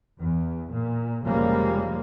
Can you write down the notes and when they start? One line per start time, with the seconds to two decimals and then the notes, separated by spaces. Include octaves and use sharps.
0.19 E2
0.73 A#2
1.25 F1 C#3 F3 G3 G#3 A#3